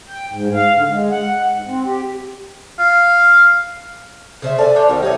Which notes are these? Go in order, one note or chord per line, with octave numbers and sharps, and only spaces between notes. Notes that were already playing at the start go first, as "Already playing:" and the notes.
G5
G#2
F5
D3
G#3
F#5
G#2
C4
G4
F5
C#3 C5 E5
A4 D5 F5 G#5
D4 C5 C#5
C2 D#3 G3
G3 D#4 C#5 E5